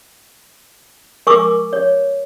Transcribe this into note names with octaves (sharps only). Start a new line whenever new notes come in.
A#4 G#5 C#6 D6 E6
C#5